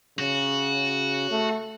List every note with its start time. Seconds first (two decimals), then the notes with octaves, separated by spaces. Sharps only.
0.19 C#3 F#4
1.31 A3